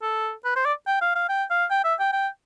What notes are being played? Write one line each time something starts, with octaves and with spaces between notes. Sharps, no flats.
A4
B4
C5
D5
G5
F5
F5
G5
F5
G5
E5
G5
G5